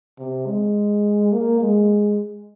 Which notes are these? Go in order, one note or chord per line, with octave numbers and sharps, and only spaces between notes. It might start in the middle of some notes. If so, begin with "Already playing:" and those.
C3
G#3
A#3
G#3